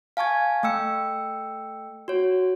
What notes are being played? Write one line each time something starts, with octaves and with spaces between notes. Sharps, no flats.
F5 G#5 A5 C#6 G#6
A3 G5 E6 C#7
F#4 C#5